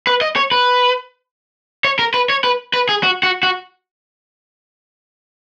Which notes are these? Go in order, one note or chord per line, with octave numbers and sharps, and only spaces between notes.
B4
D#5
C#5
B4
C#5
A#4
B4
C#5
B4
B4
G#4
F#4
F#4
F#4